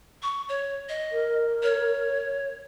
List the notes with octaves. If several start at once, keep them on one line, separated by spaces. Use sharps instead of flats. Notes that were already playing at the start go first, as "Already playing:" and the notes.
C#6
C#5
D#5
A#4
C#5